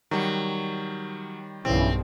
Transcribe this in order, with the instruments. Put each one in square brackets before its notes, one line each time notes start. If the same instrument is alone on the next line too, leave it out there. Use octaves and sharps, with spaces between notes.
[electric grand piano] D#3 G3 [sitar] F#3
[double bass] B1 G2 [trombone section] C#3 E3 [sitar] C4